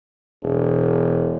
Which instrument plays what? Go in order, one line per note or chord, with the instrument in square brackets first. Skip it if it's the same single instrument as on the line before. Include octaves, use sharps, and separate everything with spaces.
[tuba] E1